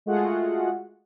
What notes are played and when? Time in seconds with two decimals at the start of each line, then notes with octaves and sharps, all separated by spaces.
0.06 G#3 A3 F4 F#4 G#4 F#5